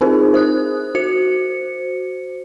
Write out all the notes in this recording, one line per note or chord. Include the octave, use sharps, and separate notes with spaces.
C4 D#4 F4 G#4 A#4 C5
C5 D#6 F#6
F#4 C5 C#7